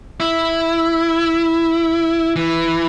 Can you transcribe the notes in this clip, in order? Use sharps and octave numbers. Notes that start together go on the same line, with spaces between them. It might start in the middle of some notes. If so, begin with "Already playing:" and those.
E4
E3